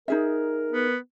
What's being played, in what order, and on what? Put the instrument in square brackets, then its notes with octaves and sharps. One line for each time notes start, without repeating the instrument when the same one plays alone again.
[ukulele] D#4 G#4 E5 [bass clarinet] A#4
[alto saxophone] B3